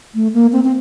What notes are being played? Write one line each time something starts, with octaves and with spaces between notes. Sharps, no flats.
A3
A#3
C4
C4